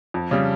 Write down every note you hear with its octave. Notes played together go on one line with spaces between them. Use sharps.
F2
C#3 G3